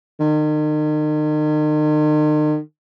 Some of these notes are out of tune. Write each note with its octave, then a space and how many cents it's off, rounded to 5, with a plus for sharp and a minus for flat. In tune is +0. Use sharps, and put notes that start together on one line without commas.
D#3 -40